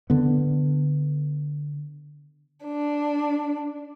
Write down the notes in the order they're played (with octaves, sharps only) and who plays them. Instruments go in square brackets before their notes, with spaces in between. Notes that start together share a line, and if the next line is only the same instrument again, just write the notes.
[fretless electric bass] D3 B3
[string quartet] D4